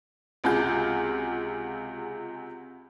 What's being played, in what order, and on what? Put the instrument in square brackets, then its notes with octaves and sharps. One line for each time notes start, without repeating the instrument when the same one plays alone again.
[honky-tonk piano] C#2 C3 F4 F#4 G#4 G6